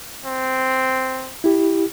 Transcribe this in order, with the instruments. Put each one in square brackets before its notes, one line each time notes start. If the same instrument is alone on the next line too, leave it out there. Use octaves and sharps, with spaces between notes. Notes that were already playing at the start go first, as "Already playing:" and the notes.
[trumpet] C4
[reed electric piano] E4 G4